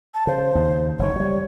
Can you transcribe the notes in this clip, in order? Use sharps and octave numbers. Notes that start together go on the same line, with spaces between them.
A5
C#3 C5
D#2
F#1 D#3 C#5
F#3 G3